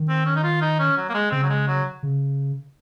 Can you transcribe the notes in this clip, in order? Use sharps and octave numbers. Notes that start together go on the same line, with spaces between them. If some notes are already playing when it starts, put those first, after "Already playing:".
Already playing: D#3
C4
C#4
D#4
F4
D#4
C#4
F#3
A#3
G#3
C#3 C4
F#3
G#3
F#3
C#3